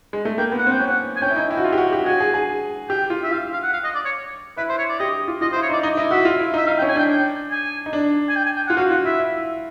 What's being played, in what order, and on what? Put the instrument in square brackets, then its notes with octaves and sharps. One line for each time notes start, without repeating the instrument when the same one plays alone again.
[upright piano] G#3
A3
[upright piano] A#3 [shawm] G5
[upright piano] B3
[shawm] F#5
[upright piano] C4
[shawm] G5
[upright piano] C#4
[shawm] F#5
G#5
[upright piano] C#4 [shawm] G5
[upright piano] E4
D#4
E4
F#4
F4
G4
F#4
G4
[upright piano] F#4 [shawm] G#5
[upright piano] G#4
G#4
[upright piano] G4 [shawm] G5
[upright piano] F4
[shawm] E5
[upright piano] F4 [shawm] F5
[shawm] F5
F#5
F5
D#5
D5
C#5
[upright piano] E4 [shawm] B4
[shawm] C5
C#5
D5
[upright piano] G4 [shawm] D#5
[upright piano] F4
[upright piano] F4 [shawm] D#5
[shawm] C5
[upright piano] E4
[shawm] C#5
[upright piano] D#4 [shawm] D5
[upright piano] D#4 [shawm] D#5
[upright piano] E4 [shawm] D#5
[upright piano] F#4 [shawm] E5
[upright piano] F4
E4
[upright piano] D#4 [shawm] E5
[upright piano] D#4 [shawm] F5
[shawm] G5
[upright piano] C#4
[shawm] G#5
[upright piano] D4 [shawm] G5
[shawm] G5
G#5
[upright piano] D#4
D4
[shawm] G#5
G5
G#5
G5
F#5
[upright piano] F4
[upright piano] F#4 [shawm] F5
[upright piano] F4 [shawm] F#5
[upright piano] E4 [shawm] E5
[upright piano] E4